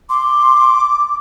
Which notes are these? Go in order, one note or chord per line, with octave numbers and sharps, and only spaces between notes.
C6 D6